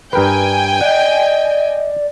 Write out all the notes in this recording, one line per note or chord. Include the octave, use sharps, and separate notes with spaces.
G2 A#4 B4 G5 G#5
D5 D#5 F#5